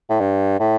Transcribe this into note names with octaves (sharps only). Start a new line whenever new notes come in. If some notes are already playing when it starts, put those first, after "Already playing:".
A2
G2
A2